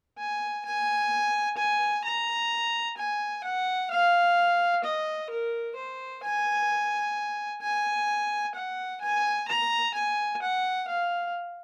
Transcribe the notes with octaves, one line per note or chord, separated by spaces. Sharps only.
G#5
G#5
G#5
A#5
G#5
F#5
F5
D#5
A#4
C5
G#5
G#5
F#5
G#5
A#5
G#5
F#5
F5